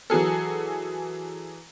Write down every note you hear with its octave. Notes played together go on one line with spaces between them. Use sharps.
E3 F#3 G#4 A4